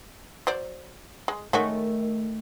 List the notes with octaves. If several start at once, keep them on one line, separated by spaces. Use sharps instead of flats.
F#3 C5 D5
G#3
D#3 G#3 A3 C#4 F#4